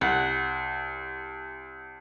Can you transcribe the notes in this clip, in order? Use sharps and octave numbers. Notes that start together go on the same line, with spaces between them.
C2 F#5